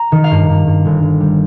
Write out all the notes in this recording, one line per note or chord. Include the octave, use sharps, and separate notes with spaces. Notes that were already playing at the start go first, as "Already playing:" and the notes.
Already playing: A#5
D#3
F5
G2
G2
G2
G1
G1
G3